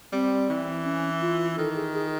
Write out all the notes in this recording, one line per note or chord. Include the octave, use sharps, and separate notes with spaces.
G3 C4
E3
C#4
F4
D#3 A4
G#4
G#4